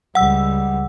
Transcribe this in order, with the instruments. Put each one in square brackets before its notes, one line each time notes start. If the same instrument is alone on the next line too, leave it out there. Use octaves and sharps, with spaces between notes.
[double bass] C#2 G3 [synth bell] F#5 E6